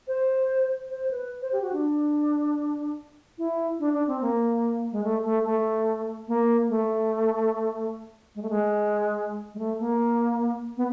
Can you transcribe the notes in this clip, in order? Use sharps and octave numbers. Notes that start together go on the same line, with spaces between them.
C5
C5
B4
C5
G4
F#4
D4
E4
D4
D4
C4
A#3
G#3
A3
A3
A3
A#3
A3
G#3
A3
G#3
G#3
A3
A#3
B3